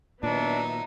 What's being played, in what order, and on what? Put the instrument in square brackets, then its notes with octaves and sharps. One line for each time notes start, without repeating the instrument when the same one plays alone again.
[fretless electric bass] A#2 D#3 [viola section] F#3 B3 E5 [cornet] D4 [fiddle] D#4